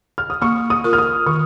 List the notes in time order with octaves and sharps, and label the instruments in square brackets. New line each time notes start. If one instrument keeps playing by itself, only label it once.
[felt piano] F6
D#6
[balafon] A#3 [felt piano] C#6
[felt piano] D#6
[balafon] F4 A#4
[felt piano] F6
D#6
[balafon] D#3 [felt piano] C#6